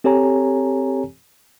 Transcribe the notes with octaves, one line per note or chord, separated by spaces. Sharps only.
C4 G4 A4 C#5 G#5 A#5